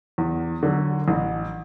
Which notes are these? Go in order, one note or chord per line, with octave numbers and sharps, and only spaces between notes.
E2
D3 F#3
A1